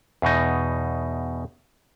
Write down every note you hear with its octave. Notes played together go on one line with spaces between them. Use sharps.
E2 B2 D#4